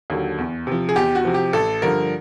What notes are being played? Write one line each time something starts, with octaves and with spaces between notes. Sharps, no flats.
D#2 D3 F#3
E2
C3 F3
G#4
E2 G4
F#4
C3 F3
G4
A1 A4
G2 D3 F3 A#4